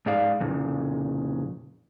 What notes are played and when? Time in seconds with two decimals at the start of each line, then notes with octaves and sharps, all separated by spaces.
0.06 G#2 G#4 D5 F5
0.40 F2 A#2 C#3